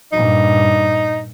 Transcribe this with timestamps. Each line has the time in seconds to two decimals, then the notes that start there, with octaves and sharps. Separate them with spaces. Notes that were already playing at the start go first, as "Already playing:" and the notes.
0.12 G2 A#2 D#4